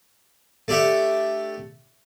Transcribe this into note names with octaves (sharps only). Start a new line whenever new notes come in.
A3 D4 G4 E5 F#5